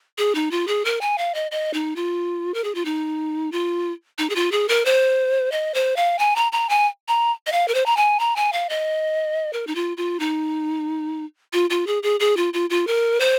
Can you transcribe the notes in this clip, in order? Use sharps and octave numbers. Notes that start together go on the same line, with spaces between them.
G#4
D#4
F4
G#4
A#4
G#5
F5
D#5
D#5
D#4
F4
A#4
G#4
F4
D#4
F4
D#4
G#4
F4
G#4
A#4
C5
D#5
C5
F5
G#5
A#5
A#5
G#5
A#5
D#5
F5
A#4
C5
A#5
G#5
A#5
G#5
F5
D#5
A#4
D#4
F4
F4
D#4
F4
F4
G#4
G#4
G#4
F4
F4
F4
A#4
C5